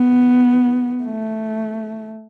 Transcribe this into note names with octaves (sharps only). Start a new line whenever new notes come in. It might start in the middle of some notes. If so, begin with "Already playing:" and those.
Already playing: B3
A3